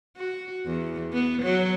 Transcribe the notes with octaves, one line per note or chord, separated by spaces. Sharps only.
F#4
E2
B3
F#3